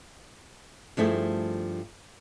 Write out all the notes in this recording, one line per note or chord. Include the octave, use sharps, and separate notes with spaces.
G2 F3 A3 E4 G#4